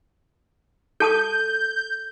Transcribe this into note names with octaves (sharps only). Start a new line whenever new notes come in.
A4 A5 D#6 G6